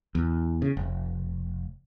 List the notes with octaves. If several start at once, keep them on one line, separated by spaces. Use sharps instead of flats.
E2
C#3
F1